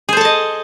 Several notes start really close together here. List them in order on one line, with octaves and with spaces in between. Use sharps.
G#4 C5 A4 A5 D#5